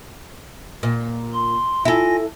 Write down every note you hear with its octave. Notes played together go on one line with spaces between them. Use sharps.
A#2
C6
E4 F4 A4 G#5 A#6